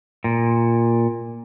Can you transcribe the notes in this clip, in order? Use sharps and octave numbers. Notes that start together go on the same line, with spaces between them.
A#2